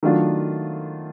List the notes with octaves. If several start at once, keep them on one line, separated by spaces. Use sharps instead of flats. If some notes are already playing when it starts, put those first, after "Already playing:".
D#3 F#3 A3 D4 F4